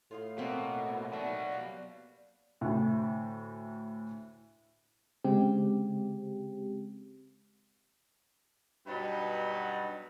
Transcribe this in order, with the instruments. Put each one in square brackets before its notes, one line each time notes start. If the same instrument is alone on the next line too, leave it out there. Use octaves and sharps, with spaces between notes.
[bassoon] A2 [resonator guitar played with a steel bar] F4 G#4 F5
[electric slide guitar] B2 [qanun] A#3 C4
[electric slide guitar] B2 F#3 [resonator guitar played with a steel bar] D5 E5
[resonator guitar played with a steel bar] G3 B4 F5
[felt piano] D2 A2
[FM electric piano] C#3 G#3 C4 G4
[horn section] G2 B2 F#3 D4 D#4 B4